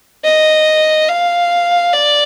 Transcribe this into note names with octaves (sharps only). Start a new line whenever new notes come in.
D#5
F5
D5